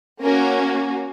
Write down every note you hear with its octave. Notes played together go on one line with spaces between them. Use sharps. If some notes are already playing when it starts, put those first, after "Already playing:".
A#3 C#4 F#4 A#4